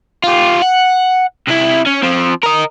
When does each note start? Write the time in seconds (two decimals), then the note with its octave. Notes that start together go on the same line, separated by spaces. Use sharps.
0.24 F4 G4
0.62 F#5
1.47 C3 E4
1.86 C#4
2.03 F3 C4
2.43 A#4 D#5